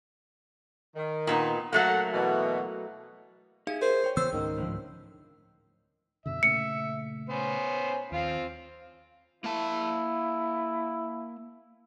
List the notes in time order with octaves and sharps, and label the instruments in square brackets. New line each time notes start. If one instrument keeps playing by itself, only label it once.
[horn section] D#3
[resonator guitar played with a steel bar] A#2 B3 D#4
[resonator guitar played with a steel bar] F#3 A3 A#3 [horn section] F#5
[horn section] B2 E3
[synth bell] D#4 F5 [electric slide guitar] G4 G#4 E5
[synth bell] A#4 [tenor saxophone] C5
[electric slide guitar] C#5 G5
[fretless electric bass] C#3 E3 B3 [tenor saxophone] C5 [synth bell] E6
[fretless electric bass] C#2 G#2 C#4 [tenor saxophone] D#3
[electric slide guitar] A2 D3 F3
[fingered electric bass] F#2 B2 D3 [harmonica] E5
[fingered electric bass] A#2 C#3 A3 [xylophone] C#7
[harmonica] B3 C#4 C5
[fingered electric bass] D#2 [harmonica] C4 F4 F5
[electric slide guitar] A#3 A5 [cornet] E4